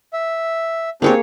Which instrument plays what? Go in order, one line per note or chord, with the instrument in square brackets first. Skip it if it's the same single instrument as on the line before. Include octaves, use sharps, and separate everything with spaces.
[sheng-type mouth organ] E5
[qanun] A#3 G#4 C#5 [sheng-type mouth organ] C4 D4 G4